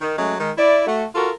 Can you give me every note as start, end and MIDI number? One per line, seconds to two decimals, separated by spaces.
0.01 0.16 51
0.18 0.34 54
0.18 0.34 56
0.18 0.34 57
0.18 0.34 61
0.39 0.50 51
0.39 0.50 56
0.57 0.82 64
0.57 0.82 74
0.87 1.04 57
0.87 1.04 66
1.15 1.31 65
1.15 1.31 66
1.15 1.31 69
1.15 1.31 70